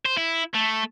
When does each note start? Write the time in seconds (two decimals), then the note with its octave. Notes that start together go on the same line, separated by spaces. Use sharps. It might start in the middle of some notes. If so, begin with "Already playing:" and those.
0.06 C5
0.17 E4
0.54 A3